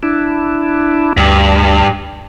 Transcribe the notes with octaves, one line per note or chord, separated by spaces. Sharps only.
D4 E4
D2 G2